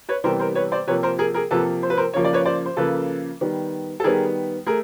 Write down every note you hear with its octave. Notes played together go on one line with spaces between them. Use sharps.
B4 C#5
C3 E3 G3 B3 A#4 C5
A#4 C5
B4 C#5
C5 D5
C3 F3 A#3 B4 C#5
A#4 C5
G#4 A#4
G#4 A#4
C3 F3 A#3 A4 B4
C5
B4
A#4 C5
C#3 F3 A#3 C#5
D5
B4 C#5
C5 D5
C5
C#3 F3 A#3 A4 B4
D#3 G3 B3
A4
D#3 G3 B3 G#4 A#4
A3 G#4 A#4